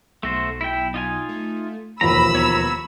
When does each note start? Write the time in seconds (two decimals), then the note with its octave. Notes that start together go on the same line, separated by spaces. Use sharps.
0.23 B1 A3 F#4 C5
0.61 E4 G5
0.94 D#4 F4 G#5
1.29 A3
2.01 E1 A1 D#2 F3 B4 A#5 B5 E6
2.35 B3 C#5 A#5